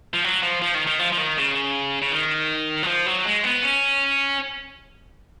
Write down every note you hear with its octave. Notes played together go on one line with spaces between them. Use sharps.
F3
F#3
F3
F3
D#3
D#3
F3
F3
D#3
C#3
C#3
D#3
F#3
F3
F#3
G#3
B3
C#4